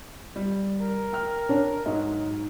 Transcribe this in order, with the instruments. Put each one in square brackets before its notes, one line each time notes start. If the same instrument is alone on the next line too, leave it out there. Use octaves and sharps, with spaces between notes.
[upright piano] G3
[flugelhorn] A#4
[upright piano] G5 F6
[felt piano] D4 C#5
[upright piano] G#2 [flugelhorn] F#3 [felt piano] D#5